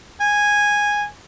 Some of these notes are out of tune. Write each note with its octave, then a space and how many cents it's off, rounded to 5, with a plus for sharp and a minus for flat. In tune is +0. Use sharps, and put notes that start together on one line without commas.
G#5 -10